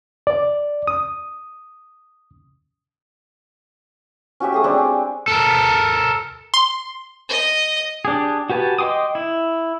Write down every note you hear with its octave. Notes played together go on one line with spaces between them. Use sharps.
D5
D#6
C#4 F#4 G4 E5
A3 G#4 D#6
G3 G#3 C4 D4
G#5
A4 A#4
C6
D#5
D4 G4 G#4
F#4 G4 B4 G#5 A5
D#5 G5 C6 D6 D#6
E4